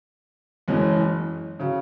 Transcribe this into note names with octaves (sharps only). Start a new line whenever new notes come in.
F#1 F#2 E3 G#3 C#4
C#3 F#3